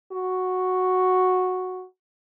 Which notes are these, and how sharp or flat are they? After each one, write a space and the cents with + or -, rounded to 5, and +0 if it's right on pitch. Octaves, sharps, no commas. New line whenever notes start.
F#4 -5